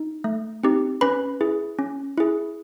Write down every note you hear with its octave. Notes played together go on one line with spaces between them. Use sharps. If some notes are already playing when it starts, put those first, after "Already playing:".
Already playing: D#4
A3
C4 D#4 G4
C#4 B4 B5
E4 G#4
C#4
E4 G#4